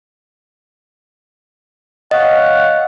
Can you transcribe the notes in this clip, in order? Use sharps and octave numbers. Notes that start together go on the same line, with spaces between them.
C#5 D#5 F5 F#5